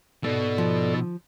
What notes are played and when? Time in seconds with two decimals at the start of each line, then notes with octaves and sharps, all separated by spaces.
0.24 G#2 B2 A4 D5
0.58 F3